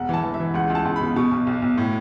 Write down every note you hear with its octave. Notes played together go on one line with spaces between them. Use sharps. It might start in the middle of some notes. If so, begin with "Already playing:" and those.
Already playing: E1 F#5
E3 A5
E3
E5
E3
C#2 F#5
C#2
A5
C#2
B5
B2
B2 C#6
B1
B1
B1
A2